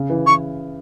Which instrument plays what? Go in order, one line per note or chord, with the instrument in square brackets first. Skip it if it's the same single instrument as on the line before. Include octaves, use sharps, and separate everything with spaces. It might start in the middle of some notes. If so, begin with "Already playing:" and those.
Already playing: [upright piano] C#3
E3
[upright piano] E3 [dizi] C#6